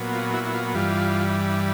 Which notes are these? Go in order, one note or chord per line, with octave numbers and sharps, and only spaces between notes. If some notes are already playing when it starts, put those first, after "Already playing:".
Already playing: A#2 F#3 B3
F4
E4 F#4
E4
F4
G2 E3 G3 F4